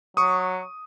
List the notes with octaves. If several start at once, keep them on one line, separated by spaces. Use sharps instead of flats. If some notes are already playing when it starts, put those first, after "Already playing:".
F#3 C#6 D#6